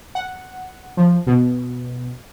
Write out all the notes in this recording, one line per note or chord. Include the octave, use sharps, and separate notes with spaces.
F#5
F3
B2